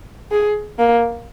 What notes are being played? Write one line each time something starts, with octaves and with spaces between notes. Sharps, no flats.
G#4
A#3